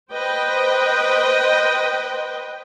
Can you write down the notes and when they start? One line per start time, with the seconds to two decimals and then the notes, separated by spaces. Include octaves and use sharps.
0.12 B4 C5 D#5 G5